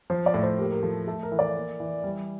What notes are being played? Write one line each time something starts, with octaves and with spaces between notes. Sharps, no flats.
F3 C5
D5
A2
C5
A#3 G4
A#4
F3 A4
A3 A4
A#4
E3
D5
A#3
E3
G3